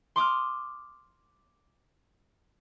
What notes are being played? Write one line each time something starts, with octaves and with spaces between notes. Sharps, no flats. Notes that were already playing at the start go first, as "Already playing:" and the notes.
C6 D6 D#6 F6